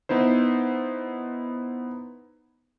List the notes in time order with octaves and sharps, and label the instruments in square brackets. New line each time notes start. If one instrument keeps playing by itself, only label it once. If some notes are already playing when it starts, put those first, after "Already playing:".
[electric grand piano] B3 D#4 E4 C5